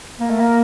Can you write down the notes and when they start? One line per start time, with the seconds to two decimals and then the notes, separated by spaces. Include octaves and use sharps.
0.20 A#3 A#4
0.30 A3
0.39 A#3